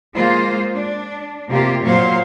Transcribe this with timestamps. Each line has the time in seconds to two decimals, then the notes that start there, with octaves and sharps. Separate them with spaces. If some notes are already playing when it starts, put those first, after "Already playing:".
0.15 G#3 A#3 F4 C5
0.75 D4
1.50 C3 A#3 C4 F4 G4
1.84 A#2 F#3 C5 C#5 F5